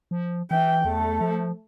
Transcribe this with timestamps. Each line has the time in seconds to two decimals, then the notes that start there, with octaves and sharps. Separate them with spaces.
0.11 F3
0.51 E3 E5 G5
0.85 E2 A3 A4
1.21 F3